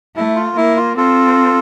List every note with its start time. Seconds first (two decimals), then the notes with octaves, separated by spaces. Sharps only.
0.16 A3 E4
0.36 F4
0.56 A#3 E4
0.76 F4
0.97 C4 F4 A4